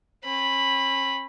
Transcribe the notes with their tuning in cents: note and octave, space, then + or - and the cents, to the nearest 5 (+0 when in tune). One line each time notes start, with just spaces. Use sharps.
C#4 -45 B5 +0